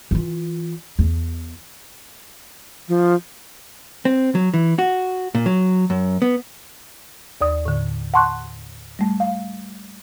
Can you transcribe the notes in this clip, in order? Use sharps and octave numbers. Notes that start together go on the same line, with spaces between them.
E3 F4
E2
F3
C4
F#3
E3
F#4
A#2
F#3
F#2
B3
D#2 D5 D#6
A2 D3
F#5 A5 C6 C#6 F#6
G3 A3
F5